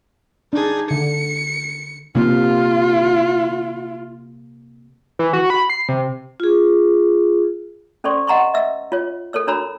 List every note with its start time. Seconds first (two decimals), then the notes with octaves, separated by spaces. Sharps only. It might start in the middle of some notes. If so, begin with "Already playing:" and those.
0.53 D4 D#4 G#4
0.91 D3 C#7
2.15 C3 A#3 F4
5.19 E3
5.33 F#4
5.50 B5
5.70 C7
5.89 C3
6.40 F4 G#4
8.04 C#4 A4 C5 D5 C6 C#6
8.27 D#5 F#5 A#5 C6 C#6
8.54 D#5 E5 E6
8.92 F4 C#5
9.33 A4 A#4 C#5 E6
9.47 D4 F#4 C#5 A#5 B5 E6